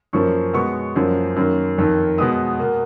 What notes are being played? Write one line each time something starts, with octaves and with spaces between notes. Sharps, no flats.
F#2 F3 A#3 C#6
B2 G#3 B3 C#6
F#2 F3 A#3
F#2 D#3 A#3
F2 D#3 A#3
B2 G#3 B3 D#6
B2 A#3